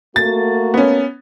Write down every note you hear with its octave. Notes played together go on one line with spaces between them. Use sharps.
A3 A#3 F#4 A6
B3 C#4